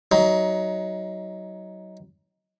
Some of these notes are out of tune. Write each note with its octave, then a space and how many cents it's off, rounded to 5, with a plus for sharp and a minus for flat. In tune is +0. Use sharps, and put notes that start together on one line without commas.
F#3 +25 D#4 +25